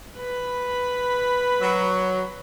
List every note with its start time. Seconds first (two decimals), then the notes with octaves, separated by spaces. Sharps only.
0.18 B4 B5
1.61 F#3